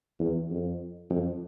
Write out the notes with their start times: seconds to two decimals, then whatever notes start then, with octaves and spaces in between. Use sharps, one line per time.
0.19 E2
0.50 F2
1.10 F2